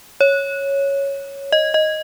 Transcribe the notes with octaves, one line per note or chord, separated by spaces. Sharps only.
C#5
D#5
D#5